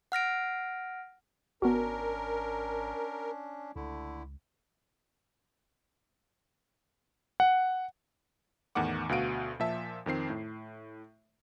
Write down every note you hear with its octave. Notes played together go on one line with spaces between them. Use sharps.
F#5 F6 A#6 D7
G#1 B3 C#4 D4 F#4 A#4
C#2 D3 A3 E4
F#5
E2 A2 D#3 F#5 D6
D2 B2 F#4 F5 D7 D#7
A#2 F3 E5 A5
F2 D#3 C4 C7
A2